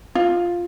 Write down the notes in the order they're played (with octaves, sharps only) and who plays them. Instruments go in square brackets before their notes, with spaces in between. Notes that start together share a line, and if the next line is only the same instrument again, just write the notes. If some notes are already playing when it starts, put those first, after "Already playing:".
[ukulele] F4